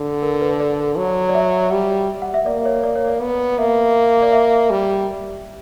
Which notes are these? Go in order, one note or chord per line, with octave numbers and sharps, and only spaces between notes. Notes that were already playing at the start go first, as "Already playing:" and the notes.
Already playing: D3
A#4
B4
D5
F#3
D5
E5
G3
F#5
E5
A#3 D5
C#5
D5
C#5
D5
B3
A#3 E5
D5
E5
G3